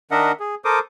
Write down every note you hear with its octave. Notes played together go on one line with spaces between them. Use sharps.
D#3 D4 A#4 D#5 E5 F#5
G#4
A4 A#4 C5 D6 D#6